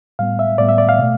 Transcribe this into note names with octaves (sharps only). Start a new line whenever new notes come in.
A2 G3 B3 F5
E5
A2 G3 B3 D5
E5
D5
F5
B2 A3